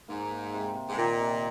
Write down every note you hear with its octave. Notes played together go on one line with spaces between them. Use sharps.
G#2 A#3
A#3
C3
C3
G#2
A#2 D#3
C3